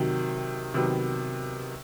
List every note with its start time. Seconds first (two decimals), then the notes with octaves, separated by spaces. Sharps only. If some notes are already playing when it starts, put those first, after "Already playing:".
Already playing: C3 D#3 F#3
0.74 C3 D#3 F#3 B3